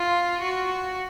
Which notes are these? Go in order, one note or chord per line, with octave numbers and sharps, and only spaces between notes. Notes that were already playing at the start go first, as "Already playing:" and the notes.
Already playing: F4
F#4